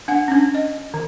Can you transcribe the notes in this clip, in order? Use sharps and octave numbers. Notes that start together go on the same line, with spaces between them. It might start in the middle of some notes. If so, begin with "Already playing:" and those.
D4 F#5
C#4 D4
D#5
D#3